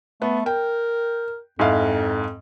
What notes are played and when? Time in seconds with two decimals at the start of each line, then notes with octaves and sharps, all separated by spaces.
0.22 A3 B3
0.46 A#4 G5
1.59 F2 G#2 E4 F5